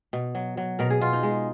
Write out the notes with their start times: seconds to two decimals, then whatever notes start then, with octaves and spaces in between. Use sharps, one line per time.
0.13 B2
0.35 F#3
0.57 F#3
0.79 B2 A#4
0.90 G#4
1.01 B2 F4
1.13 D#4
1.23 G#3